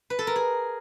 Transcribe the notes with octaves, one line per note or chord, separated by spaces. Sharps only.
B4
A4
A#4
G#4